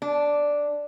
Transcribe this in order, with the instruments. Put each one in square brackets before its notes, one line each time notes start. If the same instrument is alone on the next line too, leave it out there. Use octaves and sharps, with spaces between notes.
[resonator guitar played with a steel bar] D4